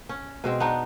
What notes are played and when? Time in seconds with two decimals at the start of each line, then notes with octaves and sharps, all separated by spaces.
0.09 C#4
0.44 B2 G#3 C4
0.60 B3 D4 D#4